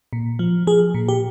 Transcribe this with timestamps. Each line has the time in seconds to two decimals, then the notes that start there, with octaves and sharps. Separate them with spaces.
0.13 A#2
0.39 F3
0.67 F3 G#4
0.94 A#2
1.09 G4